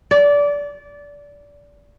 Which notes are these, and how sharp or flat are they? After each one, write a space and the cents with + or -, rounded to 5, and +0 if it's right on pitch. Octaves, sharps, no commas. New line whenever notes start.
D5 -20